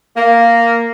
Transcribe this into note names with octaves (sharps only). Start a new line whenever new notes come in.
A#3